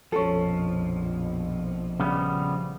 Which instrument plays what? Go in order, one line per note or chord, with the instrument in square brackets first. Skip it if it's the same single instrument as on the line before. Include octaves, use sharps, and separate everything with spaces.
[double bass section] A#1 F2 B2 [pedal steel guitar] F3 [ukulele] C#4 A4
[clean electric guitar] C#3 G3 B3